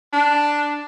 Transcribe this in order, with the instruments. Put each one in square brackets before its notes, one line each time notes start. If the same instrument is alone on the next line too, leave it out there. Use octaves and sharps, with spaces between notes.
[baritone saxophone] D4